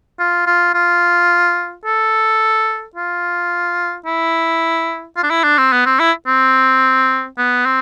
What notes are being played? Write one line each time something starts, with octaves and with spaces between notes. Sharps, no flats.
F4
F4
F4
A4
F4
E4
F4
D4
E4
D4
C4
B3
C4
E4
C4
B3
C4